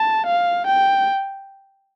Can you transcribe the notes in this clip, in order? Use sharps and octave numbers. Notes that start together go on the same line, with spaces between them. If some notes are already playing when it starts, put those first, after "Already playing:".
Already playing: A5
F5
G5